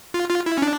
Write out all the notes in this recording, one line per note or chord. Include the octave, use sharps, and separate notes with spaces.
F4
F4
E4
C#4
D4